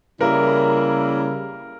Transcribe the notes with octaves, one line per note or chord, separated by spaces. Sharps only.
C#3 G3 A#3 E4 A#4